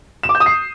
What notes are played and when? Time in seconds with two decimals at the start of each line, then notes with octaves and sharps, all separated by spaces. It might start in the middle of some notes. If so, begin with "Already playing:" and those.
0.23 E7
0.29 D6
0.35 G6
0.40 D#6
0.46 C7